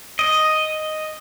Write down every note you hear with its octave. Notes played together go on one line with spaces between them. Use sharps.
D#5